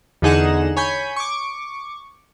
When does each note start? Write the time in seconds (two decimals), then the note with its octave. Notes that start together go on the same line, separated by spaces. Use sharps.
0.22 E2 D3 D#4 G#4 F#5 E7
0.77 C#5 G#5 B5 G6
1.16 C#6 D6